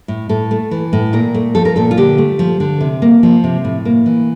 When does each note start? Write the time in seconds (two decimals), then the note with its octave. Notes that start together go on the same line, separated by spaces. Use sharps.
0.08 A2
0.29 A2 A4
0.51 A3
0.71 E3
0.93 A2
1.13 A#2 A#4
1.34 A3
1.55 F3 A4
1.65 A#4
1.76 A#2 A4
1.91 F4
1.97 D3 G4
2.18 A3
2.39 F3
2.60 D3
2.81 C3
3.02 A#3
3.23 F3
3.44 C3
3.65 A2
3.85 A#3
4.06 E3